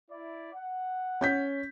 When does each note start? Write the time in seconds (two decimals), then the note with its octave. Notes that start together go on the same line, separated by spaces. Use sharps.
0.10 E4 D5
0.53 F#5
1.21 C#4 G6 B6